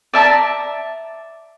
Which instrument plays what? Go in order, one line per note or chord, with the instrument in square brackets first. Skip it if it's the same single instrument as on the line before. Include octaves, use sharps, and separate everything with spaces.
[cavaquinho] D5 E5 A5 A#5